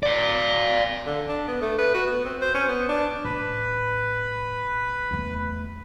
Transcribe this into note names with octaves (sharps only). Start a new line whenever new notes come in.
D5 F5
D3
D4
B3
A3
B4
F#4
B3
C4
C5
C#4
B3
D4
A2 B4
E2 A3